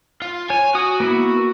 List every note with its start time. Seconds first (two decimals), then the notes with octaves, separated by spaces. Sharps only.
0.22 F4
0.50 C#5 G#5
0.75 F#4 D#6
1.00 A#3 B3 E4